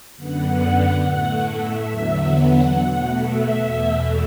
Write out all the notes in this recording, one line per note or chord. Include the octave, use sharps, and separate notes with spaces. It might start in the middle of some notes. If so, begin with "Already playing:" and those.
F#2 D3 B3 F#5
A2 A3 F#5
E5
E2 D3 F#3 B3
F#5
B2 A3
E5
E2 B2 A3